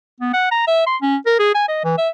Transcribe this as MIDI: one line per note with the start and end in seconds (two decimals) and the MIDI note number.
0.21 0.34 59
0.34 0.48 78
0.51 0.66 82
0.68 0.86 76
0.87 0.96 84
1.02 1.16 61
1.26 1.35 70
1.39 1.53 68
1.55 1.68 80
1.68 1.80 75
1.84 1.93 52
1.98 2.09 76